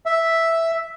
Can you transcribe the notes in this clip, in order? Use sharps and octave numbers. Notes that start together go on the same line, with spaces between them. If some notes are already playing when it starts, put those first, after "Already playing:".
E5